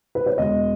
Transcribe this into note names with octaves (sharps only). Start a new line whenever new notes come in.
B4
C#5
E1 D#5